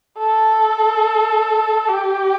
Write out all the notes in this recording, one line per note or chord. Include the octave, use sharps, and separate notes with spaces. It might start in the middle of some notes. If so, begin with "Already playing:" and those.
A4
G4